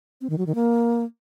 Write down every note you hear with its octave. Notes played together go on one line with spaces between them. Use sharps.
C4
D#3
F#3
D#3
A#3